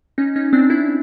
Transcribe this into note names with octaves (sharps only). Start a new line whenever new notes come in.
C#4 D#4
C#4 D#4
C4 D4
D4 E4